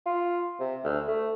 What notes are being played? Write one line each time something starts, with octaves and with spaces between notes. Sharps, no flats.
F4
C3
D2
A3